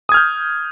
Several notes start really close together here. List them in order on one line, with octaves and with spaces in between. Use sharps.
D#6 G#6 F6 G6